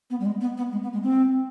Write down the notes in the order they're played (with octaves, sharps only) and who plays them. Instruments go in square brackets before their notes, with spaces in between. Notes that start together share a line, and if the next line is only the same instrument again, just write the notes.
[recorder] B3
G3
G#3
B3
B3
G#3
B3
G#3
C4